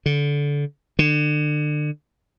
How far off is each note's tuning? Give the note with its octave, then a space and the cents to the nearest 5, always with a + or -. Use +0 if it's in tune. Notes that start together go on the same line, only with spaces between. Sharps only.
D3 -25
D3 +30